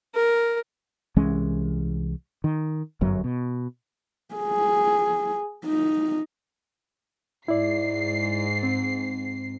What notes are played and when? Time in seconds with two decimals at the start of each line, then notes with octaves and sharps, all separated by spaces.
0.15 A#4
1.16 C2 E3 G#3 C#4
2.44 D#3
3.01 G1 F#2 F#3
3.24 B2
4.35 G#4
5.65 D#4
7.48 G#2 E4 D5 C7
8.63 C4